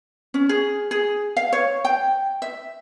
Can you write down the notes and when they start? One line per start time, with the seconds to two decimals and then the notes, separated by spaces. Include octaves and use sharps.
0.34 C#4
0.49 G#4
0.91 G#4
1.37 F5
1.53 C#5
1.85 G5
2.42 E5